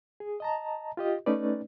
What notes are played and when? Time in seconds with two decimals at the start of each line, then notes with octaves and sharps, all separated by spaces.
0.20 G#4
0.40 D#5 A5 A#5
0.97 F4 G4 D#5
1.26 A3 C#4 D#4 B4 D5